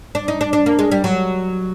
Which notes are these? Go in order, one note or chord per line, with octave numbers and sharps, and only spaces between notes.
D4
D#4
D4
D4
A#3
G#3
G3
F#3